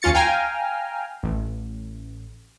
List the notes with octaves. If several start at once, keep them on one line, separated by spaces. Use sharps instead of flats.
D#2 C#4 F4 A6 C#7
F5 G5 G#5 A#5 F6
A1